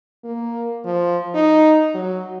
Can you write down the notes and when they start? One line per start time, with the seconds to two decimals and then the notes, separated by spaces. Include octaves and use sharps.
0.24 A#3
0.85 F3
1.35 D#4
1.94 F#3